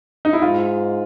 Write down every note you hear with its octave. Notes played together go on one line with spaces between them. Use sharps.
D#4
E4
G#2 F4